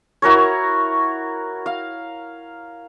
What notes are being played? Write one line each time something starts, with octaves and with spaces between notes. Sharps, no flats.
E4 F#4 A#4 C#5
F5